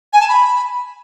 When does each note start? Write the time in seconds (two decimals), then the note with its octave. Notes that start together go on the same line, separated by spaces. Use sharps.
0.13 G#5
0.21 A5
0.29 B5